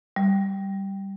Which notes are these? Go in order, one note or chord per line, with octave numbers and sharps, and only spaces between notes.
G3